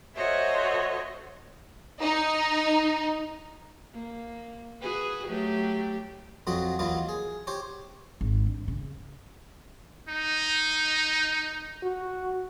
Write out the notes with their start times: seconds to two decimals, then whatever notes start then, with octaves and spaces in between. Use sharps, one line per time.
0.15 F#4 A4 C5 C#5 D#5 E5
2.00 D#4
3.93 A#3
4.82 F#4 G#4 B4
5.28 F#3 A3 G4
6.47 F2 F3 F#3 C4 F#4 D#5
6.79 D#2 E3 F#3 F4 D#5
7.09 G#4
7.47 G4 C5 C#5
8.21 G#1
8.46 D3
8.68 C#3
10.09 D#4
11.83 F#4